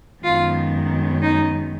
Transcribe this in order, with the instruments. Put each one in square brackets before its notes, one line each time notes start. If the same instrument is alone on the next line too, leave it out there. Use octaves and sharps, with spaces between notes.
[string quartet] F#2 D#3 G#3 B3 F4
D#4